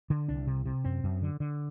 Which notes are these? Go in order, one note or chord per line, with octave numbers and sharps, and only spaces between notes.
D3
C2 D4
C3
C3
F#2 C4
F#2
D3
D3